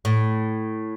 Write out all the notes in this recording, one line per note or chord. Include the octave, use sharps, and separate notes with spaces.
A2